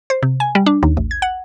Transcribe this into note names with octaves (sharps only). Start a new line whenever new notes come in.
C5
C3
G#5
G3
D4
D#2
A1
G#6
F#5